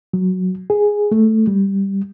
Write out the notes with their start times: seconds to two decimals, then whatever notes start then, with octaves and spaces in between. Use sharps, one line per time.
0.13 F#3
0.70 G#4
1.11 A3
1.47 G3